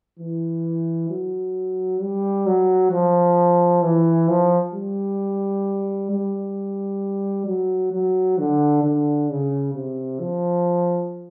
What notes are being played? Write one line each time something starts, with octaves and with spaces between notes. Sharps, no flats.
E3
F#3
G3
F#3
F3
E3
F3
G3
G3
F#3
F#3
D3
D3
C#3
C3
F3